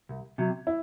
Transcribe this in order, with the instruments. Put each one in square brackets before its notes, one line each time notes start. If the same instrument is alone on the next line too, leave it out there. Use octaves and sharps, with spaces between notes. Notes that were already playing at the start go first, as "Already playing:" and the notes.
[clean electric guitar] C2
C3 F#3
[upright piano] E4